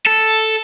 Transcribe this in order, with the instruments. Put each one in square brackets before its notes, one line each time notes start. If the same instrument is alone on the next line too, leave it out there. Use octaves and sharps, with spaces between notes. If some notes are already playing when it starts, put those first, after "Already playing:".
[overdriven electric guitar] A4